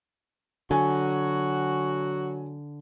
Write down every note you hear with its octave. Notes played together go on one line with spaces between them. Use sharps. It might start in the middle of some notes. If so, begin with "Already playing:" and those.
D3 F#3 F#4 G#5